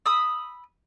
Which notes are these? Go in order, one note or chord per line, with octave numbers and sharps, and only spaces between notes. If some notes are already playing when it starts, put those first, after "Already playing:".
B5 D#6 E6